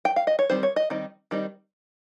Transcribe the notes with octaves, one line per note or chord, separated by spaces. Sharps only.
G5
F5
D#5
C#5
D#3 G3 C4 C5
C#5
D#5
D#3 G3 C4 D#4
D#3 G3 C4 D#4